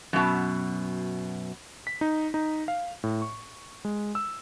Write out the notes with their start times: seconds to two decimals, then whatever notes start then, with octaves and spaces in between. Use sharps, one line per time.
0.13 F#2 B2
1.87 B6
2.01 D#4
2.34 D#4
2.68 F5
3.04 A2
3.22 C#6
3.85 G#3
4.15 E6